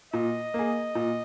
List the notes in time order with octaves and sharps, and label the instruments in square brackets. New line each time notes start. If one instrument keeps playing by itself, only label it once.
[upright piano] A#2 [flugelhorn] D#5
[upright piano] A#3 G#4
A#2